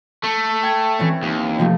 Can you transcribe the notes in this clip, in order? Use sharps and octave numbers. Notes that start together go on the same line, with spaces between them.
A3
G5 G#6
E3 C4 C#4
D#2
C3 F3 A3